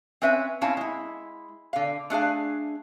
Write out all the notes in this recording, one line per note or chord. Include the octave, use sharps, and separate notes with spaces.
C4 C#4 B4 E5 F5 G#5
C4 C#4 E4 F5 A5
G#3 E4
D3 F5
A3 D4 G#4 F5